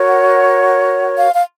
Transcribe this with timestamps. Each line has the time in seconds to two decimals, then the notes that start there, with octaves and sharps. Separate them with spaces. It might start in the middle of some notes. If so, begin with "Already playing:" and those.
Already playing: F#4 A#4 C#5
0.08 F#5
1.17 F5
1.35 F5